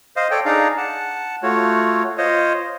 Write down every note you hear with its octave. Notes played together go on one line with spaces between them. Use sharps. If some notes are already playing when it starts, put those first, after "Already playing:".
C5 D#5 F5
A4 C#5 D5 G5
D4 D#4 G#4 D5 F5 A#5
F#5 A5
A3 F4 F#4 C#5
F4 C5 C#5 D#5